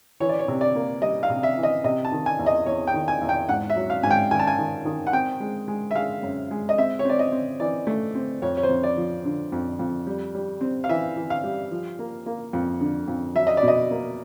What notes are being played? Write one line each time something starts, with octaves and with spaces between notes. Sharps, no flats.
E3 C#5
D5
C#5
C3
D5
A#3
G3 D#5
F5
C3
E5
E3
D#5
C3 D#5
A5
D#3
G#5
E2
D#5
E2 C#5
G5
D#3
G#5
E2
G5
G#2 F#5
E5
F#3
F5
G#2 G#5
G5
D#3 G#5
A5
G#5
D#3
D#3
F#5
C4 G5
G#3
G#3
E5
G#3 F5
F#2
G#3
D#5
C4 E5
C#5
C4 D5
D#5
C4
E3 D5
A3
C4
F2 C#5
C#5
C5
F2
D5
F3
D3
F2
F2
G3
G3
C4
F5
E3 E5
E3
F5
G3
F3
A#3
A#3
F2
D3
F2
F#3 E5
D#5
D5
B2
D#5
A#3